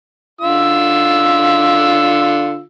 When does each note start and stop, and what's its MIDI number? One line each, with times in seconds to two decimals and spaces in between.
0.41 2.61 50
0.41 2.61 65
0.41 2.61 88